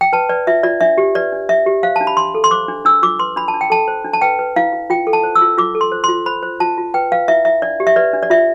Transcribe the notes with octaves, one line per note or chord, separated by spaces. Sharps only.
G5
B4 A5
B4 D5
F4 E5
F4 D5
D4 E5
G4
B4 D5
D4
D4 E5
G4
C5 F5
A5
D4
B5
D4 C6
A4
C6
C5 D6
D4
D4 E6
F4 D6
B4 C6
D4 B5
A5
D4
G5
A4 A5
C5
D4
A5
B4 G5
B4
E4 F5
E4
F4 G5
A4
A5
C5
E6
F4
F4 D6
A4
C6
C5
F4 C6
C5 B5
C5
F4 A5
F4
B4 G5
B4 F5
E4 E5
E4 E5
D4 D5
G4
E5
B4 D5
D4
D5
F4 E5